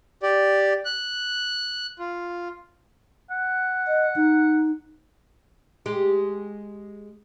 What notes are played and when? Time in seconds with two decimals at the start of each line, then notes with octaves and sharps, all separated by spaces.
0.23 G4 D5
0.85 F#6
1.99 F4
3.30 F#5
3.87 D#5
4.16 D#4
5.86 G#3 G4